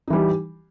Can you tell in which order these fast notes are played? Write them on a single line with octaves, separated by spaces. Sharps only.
D#4 E3 G3